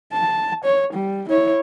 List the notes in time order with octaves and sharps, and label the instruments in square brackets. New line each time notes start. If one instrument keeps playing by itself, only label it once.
[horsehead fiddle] A5
C#5
G3
E4 C#5